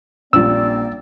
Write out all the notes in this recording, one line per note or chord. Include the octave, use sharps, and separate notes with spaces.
A#1 F3 G3 A#3 C4 D5 E6